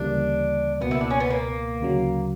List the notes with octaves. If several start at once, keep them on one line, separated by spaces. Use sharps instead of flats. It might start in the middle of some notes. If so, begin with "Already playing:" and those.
Already playing: D2 C#3 E3 G3 A#3 D4
C#2 B2 A#3 B3
E4
D4
C#4
B3
A#3
D2 C#3 F#3